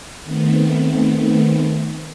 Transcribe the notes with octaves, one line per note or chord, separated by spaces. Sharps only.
D#3 A3 B3 C4